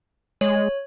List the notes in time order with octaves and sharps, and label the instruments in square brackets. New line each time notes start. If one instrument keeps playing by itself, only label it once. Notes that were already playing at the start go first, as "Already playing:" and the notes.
[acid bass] G#3 [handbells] C#5